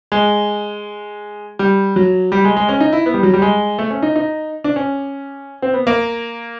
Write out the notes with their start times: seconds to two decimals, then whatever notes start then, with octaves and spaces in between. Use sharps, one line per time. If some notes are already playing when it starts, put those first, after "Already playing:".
0.12 G#3
1.59 G3
1.96 F#3
2.32 G3
2.45 G#3
2.57 G#3
2.69 C#4
2.80 D#4
2.93 E4
3.06 B3
3.14 G3
3.23 F#3
3.33 G3
3.42 G#3
3.79 A3
3.90 C#4
4.03 D#4
4.16 D#4
4.64 D4
4.76 C#4
5.62 C4
5.74 B3
5.87 A#3